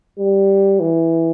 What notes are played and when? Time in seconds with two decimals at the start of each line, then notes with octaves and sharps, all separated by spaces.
0.19 G3
0.80 E3